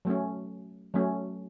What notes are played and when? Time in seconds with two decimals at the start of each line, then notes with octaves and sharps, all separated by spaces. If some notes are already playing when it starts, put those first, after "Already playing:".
0.05 F#3 A3 C#4
0.94 F#3 A3 C#4